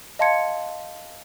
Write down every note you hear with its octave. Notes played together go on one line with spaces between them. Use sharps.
D#5 F5 A5 C6 G#6 C#7